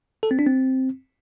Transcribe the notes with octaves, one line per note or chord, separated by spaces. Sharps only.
A4
C4
D4
C4